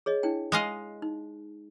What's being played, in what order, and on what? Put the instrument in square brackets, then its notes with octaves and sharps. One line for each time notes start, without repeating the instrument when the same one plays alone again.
[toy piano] G#4 C#5 D#5
D4 E4 G5
[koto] G#3 D#5 F5
[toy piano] D#4